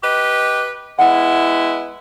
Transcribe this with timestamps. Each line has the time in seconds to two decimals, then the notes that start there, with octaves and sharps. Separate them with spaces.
0.02 G4 B4 D#5
0.99 G#3 B3 E4 F#5